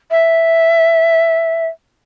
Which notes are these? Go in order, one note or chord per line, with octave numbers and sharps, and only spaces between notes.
E5